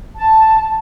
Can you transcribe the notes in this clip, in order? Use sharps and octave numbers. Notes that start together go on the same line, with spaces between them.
A5